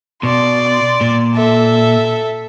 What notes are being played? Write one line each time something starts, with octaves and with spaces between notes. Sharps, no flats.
B2 D5 C6
A#2
A4 E5